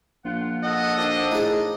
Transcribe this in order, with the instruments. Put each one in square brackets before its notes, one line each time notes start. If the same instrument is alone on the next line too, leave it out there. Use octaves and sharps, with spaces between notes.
[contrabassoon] A#1 [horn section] F4 F#5
[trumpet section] A4 D#5 [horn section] F#5
[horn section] D#3 F3 D4
[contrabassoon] A2 [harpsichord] D#4 G#4